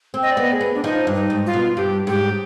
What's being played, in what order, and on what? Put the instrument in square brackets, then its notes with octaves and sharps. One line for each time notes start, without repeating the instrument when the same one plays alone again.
[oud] C4
[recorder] D#5
D5
[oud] B3 [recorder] D#5
[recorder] G#4
[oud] B3
[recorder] D4
[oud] F3 [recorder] D#4
[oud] G2
[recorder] D#4
[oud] G#2
[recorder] F4
[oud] B2
[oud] G2 [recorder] G4
[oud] G#2 [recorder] G4